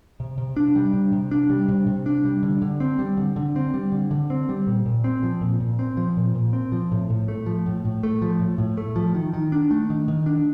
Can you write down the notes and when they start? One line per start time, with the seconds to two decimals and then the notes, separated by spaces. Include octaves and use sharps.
0.20 C3
0.38 C3
0.57 D4
0.75 G3
0.94 C3
1.13 C3
1.31 D4
1.50 G3
1.69 C3
1.87 C3
2.06 D4
2.25 G3
2.43 D3
2.62 D3
2.80 C4
2.99 G3
3.17 D3
3.36 D3
3.56 C4
3.74 G3
3.92 D3
4.11 D3
4.30 C4
4.49 G3
4.67 A#2
4.86 A#2
5.04 C4
5.23 F3
5.41 A#2
5.60 A#2
5.79 C4
5.97 F3
6.17 A#2
6.35 A#2
6.53 C4
6.72 F3
6.92 A2
7.10 A2
7.28 A3
7.46 F3
7.66 A2
7.85 A2
8.03 A3
8.22 F3
8.40 A2
8.58 A2
8.77 A3
8.96 F3
9.15 D#3
9.33 D#3
9.52 D4
9.71 A3
9.90 D#3
10.08 D#3
10.26 D4